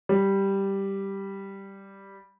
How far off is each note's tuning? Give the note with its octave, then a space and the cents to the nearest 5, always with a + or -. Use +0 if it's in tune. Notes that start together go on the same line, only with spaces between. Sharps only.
G3 +0